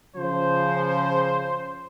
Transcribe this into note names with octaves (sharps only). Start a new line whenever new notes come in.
C#3 F3 C5